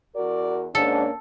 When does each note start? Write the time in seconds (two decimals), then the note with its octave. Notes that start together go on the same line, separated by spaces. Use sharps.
0.15 E2 F#4 A#4 D5
0.75 G#2 A#3 C#4 D4 A4